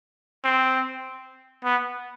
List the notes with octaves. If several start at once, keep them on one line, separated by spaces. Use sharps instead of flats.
C4
B3